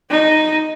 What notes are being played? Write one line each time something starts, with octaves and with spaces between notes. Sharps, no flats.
D#4